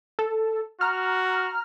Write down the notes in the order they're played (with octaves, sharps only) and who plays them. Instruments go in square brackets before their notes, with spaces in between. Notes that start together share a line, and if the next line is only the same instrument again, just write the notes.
[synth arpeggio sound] A4
[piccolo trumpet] F#4 [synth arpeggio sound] A#5 F6